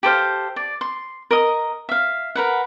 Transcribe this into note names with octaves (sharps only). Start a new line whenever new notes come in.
G4 A4 C5 F5
D5
C6
A#4 D#5 D#6
E5 F5
A#4 B4 F#5